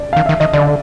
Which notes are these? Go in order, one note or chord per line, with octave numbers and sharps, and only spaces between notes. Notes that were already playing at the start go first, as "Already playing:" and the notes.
Already playing: D5
D#3 F5
D#3 E5
D#3 D#5
D3 D5